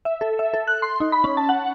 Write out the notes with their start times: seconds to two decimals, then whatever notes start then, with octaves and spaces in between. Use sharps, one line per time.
0.05 E5
0.21 A4
0.39 E5
0.54 A4
0.67 F#6
0.82 C6
1.00 D#4
1.12 B5
1.24 C#4
1.37 A5
1.49 F#5